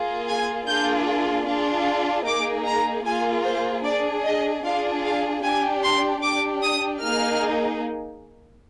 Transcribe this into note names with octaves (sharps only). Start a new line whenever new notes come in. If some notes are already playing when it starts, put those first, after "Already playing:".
Already playing: A#3 F4 G#4
G#5
A#3 D4 F4 G#4 G6
D4 F4 G#4
A#3 D#4 G#4 D6
A#5
A#3 F4 G#4 G#5
C5
D4 G#4 D5
D#5
D4 F4 G#4 F5
F5
D4 G4 G#5
C6
D4 G4 D6
D#6
A#3 D#4 G#4 F6